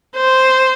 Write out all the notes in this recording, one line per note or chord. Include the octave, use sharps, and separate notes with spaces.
C5